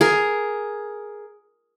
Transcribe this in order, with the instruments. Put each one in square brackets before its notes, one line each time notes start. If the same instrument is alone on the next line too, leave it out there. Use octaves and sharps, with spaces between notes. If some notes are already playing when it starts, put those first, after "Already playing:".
[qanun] G#4 A#4